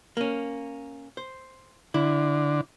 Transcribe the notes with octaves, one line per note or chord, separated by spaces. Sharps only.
A#3 C#4
C5
D3 E4